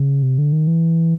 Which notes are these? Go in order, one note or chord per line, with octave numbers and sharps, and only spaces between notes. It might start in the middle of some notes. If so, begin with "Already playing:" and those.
Already playing: C#3
C3
D3
D#3
E3